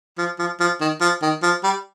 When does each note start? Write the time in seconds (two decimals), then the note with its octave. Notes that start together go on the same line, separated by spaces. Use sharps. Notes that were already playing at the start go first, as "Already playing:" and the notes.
0.18 F3
0.39 F3
0.60 F3
0.81 D#3
1.01 F3
1.22 D#3
1.43 F3
1.64 G3